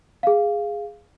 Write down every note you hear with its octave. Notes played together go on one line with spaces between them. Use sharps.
G#4 F5